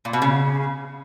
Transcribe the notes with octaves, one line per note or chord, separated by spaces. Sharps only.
A#2
B2
C#3